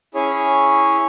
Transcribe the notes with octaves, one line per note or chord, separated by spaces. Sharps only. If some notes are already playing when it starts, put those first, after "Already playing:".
C#4 E4 G#4 C#5